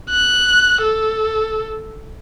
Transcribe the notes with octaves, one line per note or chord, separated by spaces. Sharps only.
F#6
A4